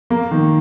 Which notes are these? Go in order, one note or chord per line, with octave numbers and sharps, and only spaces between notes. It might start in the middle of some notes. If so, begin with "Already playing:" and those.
A#3
D#3